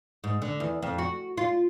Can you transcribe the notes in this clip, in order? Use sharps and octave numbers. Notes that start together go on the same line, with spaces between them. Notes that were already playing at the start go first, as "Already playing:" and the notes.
G#2
D3
E2
F2
F#4
F4